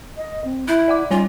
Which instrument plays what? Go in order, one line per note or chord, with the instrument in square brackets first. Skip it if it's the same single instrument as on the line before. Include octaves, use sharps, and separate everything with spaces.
[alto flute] D#5
C4
[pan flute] E4 [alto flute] E5 [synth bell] F#6 G6
[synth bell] D5 F#5 D6
[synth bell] G3 C#5 G#5 [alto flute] D#4 [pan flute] F4